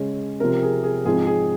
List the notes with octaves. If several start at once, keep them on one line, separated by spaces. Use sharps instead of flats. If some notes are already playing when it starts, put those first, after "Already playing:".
Already playing: C#3 G#3 C#4
C3 F3 C4 A#4
G#4
G#4
G#2 F3 G#3 C4 G#4
G#4